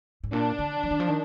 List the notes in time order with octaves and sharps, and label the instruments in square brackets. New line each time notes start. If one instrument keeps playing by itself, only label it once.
[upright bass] G#2
[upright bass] A#2 [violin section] D4
[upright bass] D3
F3
D#3
F3
D#3